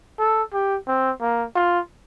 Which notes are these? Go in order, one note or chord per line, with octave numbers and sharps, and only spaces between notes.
A4
G4
C4
A#3
F4